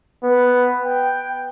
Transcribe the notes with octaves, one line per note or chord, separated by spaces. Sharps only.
B3
G5